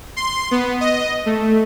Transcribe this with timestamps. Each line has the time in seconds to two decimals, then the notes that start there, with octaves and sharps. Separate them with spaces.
0.16 C6
0.51 B3
0.81 D#5
1.26 A3